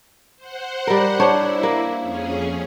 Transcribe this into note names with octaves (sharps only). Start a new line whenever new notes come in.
C5 F#5
G3 A#4
D4 E4 C5 C#5
A#3
F2 C#4 G#4